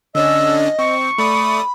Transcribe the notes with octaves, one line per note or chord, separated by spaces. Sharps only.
D3 C#4 D4 D#5 E6
C4 C#6
A3 D5 B5 D#6